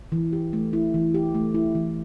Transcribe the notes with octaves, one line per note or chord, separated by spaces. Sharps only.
E3
G4
A3
E4
E3
G4
A3
E4
E3